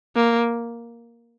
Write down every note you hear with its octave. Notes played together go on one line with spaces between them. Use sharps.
A#3